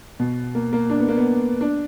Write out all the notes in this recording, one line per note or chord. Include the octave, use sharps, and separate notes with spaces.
B2
A#3
A#3
D4
B3
A#3
B3
D4